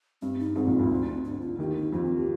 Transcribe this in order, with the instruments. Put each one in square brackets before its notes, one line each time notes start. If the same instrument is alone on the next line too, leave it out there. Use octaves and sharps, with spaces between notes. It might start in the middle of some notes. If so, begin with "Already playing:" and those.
[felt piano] G2 [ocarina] C4
[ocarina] D#4
[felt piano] G#1 G#2 [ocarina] C4
[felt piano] A#1 A#2
D2 D3
D2 D3
[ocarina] D4
F4
[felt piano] D#2 D#3 [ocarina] G4
[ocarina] D#4
[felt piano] F2 F3 [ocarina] D4
[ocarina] C4
G4